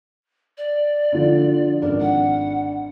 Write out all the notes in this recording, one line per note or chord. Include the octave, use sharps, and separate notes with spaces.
D5
D3 F3
G#1 D4 A#4
F#5